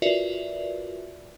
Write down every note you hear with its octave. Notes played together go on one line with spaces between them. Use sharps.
F4 F#4 A#4 B4 D5 E5